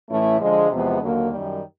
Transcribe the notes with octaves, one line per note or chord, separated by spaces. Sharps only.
A2 E3 A3 C#4 E4
D3 F3 G#3
E2 C3 F3 G#3 B3
D#2 D3 F#3 A#3
F#2 D#3 G3